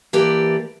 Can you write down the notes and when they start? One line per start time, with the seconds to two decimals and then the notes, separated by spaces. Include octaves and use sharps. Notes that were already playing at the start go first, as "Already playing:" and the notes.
0.13 E3 A#3 G4 A4 D5